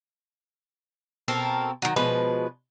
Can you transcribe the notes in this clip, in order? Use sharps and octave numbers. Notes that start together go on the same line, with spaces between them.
B2 C4 A4 A#4
D#3 F#3
B2 F3 G#3 B4